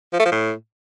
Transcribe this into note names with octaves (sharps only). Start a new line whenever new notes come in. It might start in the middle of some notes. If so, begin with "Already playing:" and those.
F3
A3
F3
A2